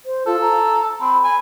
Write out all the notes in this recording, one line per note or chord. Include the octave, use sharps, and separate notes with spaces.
C5
F4 A4
A#5
C4 B5
G#5 B5